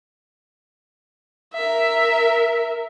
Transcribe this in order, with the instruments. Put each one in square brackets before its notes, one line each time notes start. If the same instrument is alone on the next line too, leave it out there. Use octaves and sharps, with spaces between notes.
[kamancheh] A#4 E5